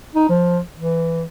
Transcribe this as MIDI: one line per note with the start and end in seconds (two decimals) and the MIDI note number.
0.15 0.26 63
0.29 0.59 53
0.78 1.22 52